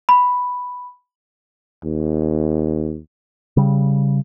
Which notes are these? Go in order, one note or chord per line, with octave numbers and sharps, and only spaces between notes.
B5
D#2
C#3 G3